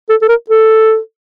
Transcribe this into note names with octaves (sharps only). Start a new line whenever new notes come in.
A4
A4
A#4
A4